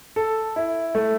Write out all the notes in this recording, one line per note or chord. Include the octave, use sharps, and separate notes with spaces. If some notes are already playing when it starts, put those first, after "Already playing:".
A4
E4
A3